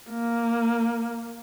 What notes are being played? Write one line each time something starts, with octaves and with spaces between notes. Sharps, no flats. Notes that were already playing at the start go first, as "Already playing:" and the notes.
A#3